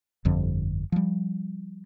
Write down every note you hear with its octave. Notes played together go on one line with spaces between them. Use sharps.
G1 F2 D3 F3
F3 G3